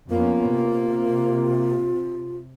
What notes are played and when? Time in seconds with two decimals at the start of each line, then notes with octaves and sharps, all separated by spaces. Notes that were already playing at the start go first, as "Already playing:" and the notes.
0.10 F2 A#3 B3 C#4 F4
0.47 C3